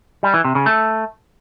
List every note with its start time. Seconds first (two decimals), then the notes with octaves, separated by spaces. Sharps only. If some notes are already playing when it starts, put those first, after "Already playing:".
0.23 G3
0.34 E3
0.45 C3
0.55 C#3
0.66 A3